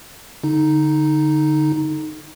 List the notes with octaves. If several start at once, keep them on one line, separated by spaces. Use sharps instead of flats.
D3 D#4